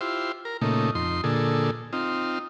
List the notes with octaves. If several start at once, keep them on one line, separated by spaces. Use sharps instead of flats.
E4 F4 G4 C5
A#4
A#2 C#3 A3 D#4
F2 D#4 C6
A#2 D3 G#4 A4
C4 D#4 F4